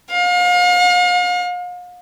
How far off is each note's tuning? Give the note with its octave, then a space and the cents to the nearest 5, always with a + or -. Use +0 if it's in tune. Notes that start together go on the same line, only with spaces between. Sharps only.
F5 +40